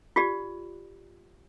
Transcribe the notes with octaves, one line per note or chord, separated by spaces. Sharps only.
F4 G4 D5